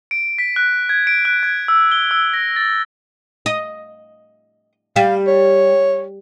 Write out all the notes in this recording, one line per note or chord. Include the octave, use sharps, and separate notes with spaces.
D7
B6
F#6
G#6
D7
F#6
G#6
E6
G7
E6
A#6
A6
D#5
G3 F5
C#5